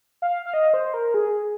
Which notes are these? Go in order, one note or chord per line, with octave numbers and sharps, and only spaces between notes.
F5
F5
D#5
C5
A#4
G#4